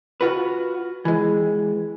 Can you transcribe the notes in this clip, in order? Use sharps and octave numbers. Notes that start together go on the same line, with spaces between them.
F4 F#4 B4
E3 G#3